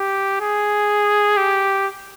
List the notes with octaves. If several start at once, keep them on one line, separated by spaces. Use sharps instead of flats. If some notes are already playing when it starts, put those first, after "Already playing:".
Already playing: G4
G#4
G4